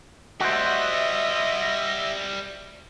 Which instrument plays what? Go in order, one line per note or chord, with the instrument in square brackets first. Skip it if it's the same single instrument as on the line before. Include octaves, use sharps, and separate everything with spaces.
[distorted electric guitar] G3 E4 [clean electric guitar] F#4 C5 [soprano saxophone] D#5 [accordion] E5